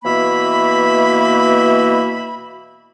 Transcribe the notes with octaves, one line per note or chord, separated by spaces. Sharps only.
B2 E3 A#3 E5 B5